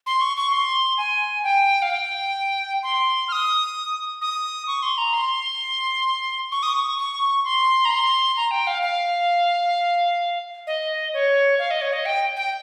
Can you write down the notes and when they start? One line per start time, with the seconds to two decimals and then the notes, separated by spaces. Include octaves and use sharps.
0.06 C6
0.21 C#6
0.37 C#6
0.52 C6
0.98 G#5
1.44 G5
1.82 F5
1.90 G5
2.83 C6
3.28 F6
3.32 D#6
4.22 D#6
4.67 C#6
4.83 C6
4.98 A#5
5.14 C6
6.52 C#6
6.63 D#6
6.73 C#6
6.98 C#6
7.45 C6
7.85 A#5
7.91 C6
8.37 A#5
8.51 G5
8.67 F5
8.82 F5
10.67 D#5
11.14 C#5
11.59 F5
11.71 D#5
11.81 C#5
11.93 D#5
12.06 G5
12.36 G5